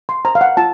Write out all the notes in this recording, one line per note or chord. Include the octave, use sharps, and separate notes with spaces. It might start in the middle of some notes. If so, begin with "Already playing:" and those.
C6
C5 A#5
F5
F#5
F4 A5